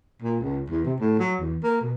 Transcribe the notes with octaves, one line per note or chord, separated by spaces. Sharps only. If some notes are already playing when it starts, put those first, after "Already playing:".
A#2
C#2
E2
C3
A2
F#3
E2
A#3
B2